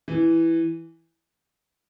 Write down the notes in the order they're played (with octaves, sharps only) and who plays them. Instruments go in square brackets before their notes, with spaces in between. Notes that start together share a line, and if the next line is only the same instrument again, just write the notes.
[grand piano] E3